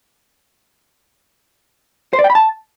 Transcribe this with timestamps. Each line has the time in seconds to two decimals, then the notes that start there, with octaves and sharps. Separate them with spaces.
2.13 C5
2.19 D5
2.24 G5
2.30 B5
2.35 A5